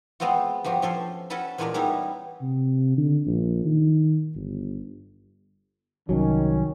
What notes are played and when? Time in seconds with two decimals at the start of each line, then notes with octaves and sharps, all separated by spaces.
0.20 G#3 B3 C4 F4 F#4
0.64 G2 F3 F#4 G4
0.82 F3 C#4 A4 C5
1.30 C#4 F#4 A4 B4 A5 B5
1.58 E2 A#2 G#3 D4 A#4 B4
1.74 G3 B3 C#4 D#4 E4
2.42 C3
2.97 D3
3.27 A#1
3.65 D#3
4.35 G1
6.09 C2 D#3 F#3 C#4